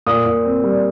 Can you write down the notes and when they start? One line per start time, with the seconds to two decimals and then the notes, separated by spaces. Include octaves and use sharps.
0.07 A#2 D#6
0.26 A#2
0.45 C4
0.64 G3